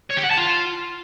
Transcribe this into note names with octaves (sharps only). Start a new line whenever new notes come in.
C#5
G4
F#5
A5
F4